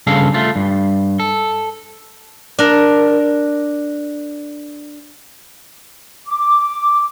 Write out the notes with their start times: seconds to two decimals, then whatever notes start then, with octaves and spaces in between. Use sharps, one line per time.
0.07 G2 C#3 A4 F5
0.34 A3 F4
0.56 G2
1.20 A4
2.59 D4 A#4
6.27 D6